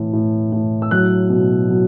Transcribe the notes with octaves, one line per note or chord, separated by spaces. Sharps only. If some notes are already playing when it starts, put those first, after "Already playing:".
Already playing: A2 E3
A2
A2
E6
F#3 F#6
B2
F#3